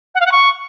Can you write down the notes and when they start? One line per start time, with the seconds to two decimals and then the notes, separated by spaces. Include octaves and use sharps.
0.14 F#5
0.20 F5
0.26 F#5
0.31 C#6